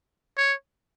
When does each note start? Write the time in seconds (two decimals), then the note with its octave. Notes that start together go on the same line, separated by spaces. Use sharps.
0.37 C#5